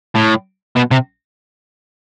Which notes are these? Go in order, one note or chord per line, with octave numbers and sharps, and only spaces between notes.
A2
B2
C3